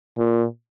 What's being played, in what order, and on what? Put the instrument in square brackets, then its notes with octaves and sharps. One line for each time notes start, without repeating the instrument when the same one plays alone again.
[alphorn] A#2